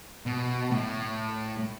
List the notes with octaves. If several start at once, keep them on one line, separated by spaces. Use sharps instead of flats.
B2
A2